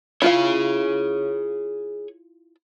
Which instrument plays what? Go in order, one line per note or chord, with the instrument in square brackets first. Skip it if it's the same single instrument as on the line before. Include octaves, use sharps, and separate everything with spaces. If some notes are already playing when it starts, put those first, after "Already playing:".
[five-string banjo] E4 F4 F5 [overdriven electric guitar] G#4 C#5